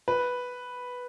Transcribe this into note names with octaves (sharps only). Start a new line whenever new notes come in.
B4